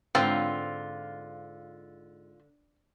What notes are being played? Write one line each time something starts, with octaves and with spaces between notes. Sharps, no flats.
G#2 D3 C4 F4 B4 F5